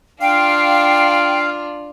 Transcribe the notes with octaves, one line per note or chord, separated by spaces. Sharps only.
D4 F4 F5 G5